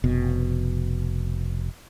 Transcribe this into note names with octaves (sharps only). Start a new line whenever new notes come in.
F1 B2